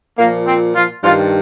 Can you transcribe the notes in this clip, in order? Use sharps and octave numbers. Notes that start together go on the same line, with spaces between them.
A#2 F3 A#3
C4
F3 F4
G2 F3 F4
D#3